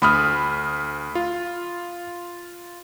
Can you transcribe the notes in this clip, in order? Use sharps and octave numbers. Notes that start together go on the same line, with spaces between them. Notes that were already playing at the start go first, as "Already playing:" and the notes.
D2 B5 D#6 F6
F4